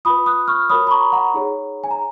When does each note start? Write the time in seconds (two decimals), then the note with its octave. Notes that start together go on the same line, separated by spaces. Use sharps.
0.05 F4 B5 D#6
0.10 B4
0.26 D#6 F#6
0.48 C#6 F6
0.70 F#4 A#4 C#5 B5 D#6
0.87 B5
0.91 A#5 C#6
1.13 F#5 A#5
1.34 D#4 G#4 C#5
1.84 G#5
1.91 A#5